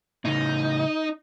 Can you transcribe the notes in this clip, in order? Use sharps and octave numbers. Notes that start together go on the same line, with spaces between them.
A2 C#3 D#4